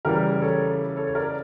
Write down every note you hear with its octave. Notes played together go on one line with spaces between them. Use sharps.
C#3 E3 G3 G4 A#4
A4 C#5
A4 C#5
C#5
A#4 D5